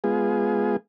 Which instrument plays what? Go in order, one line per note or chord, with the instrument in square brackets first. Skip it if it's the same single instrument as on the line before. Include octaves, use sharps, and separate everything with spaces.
[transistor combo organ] G#3 B3 F4 G#4